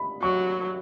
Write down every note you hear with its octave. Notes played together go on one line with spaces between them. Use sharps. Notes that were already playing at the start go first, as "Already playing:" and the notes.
Already playing: B5
F#3 C#6